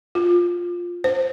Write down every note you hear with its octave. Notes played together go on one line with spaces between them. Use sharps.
F4
C5